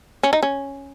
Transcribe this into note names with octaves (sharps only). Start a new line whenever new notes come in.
C#4
D#4
C#4